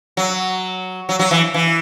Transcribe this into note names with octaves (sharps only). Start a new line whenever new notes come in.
F#3
F#3
F#3
E3
E3